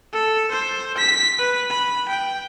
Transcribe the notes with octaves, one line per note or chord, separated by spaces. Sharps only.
A4
C5
B6
B4
B5
G5